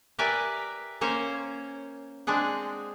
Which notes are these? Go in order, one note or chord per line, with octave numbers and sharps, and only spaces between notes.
G4 A#4 B4 D5 E5 G#5
A#3 C#4 C5 C#5
G#3 C4 D4 G#4 F#5